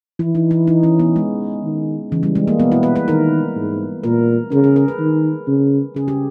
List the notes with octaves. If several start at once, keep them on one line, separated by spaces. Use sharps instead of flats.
E3 E4
D#4
E4
D#4
C#4
B3
G#3
D#3
C#3 E3
G3
G#3
A#3
B2 B3
E4
B4
B4
D#3 A#4
G#2
A#2 A#4
C#3 A#4
G#4
A#4
B4
D#3
C#3
C#3 G#4
G4